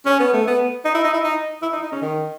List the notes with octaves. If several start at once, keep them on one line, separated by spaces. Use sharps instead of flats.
C#4
B3
A3
B3
D#4
E4
D#4
E4
D#4
E4
D#4
D#4
C#4
D#3